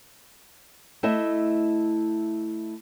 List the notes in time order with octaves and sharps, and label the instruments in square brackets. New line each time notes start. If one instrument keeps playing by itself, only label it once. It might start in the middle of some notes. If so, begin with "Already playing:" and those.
[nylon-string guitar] A3 E4 D#5 E5